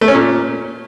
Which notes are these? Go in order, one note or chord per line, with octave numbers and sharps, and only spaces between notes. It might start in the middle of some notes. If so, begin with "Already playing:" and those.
A3
C#4
A#2